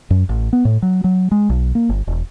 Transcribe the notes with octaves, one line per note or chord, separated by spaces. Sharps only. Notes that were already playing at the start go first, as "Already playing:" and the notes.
F#2
A1
B3
A2
F#3
F#3
G#3
B1
A#3
G1
E1